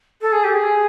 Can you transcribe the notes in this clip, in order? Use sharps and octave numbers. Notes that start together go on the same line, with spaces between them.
A4
G#4
G4
G#4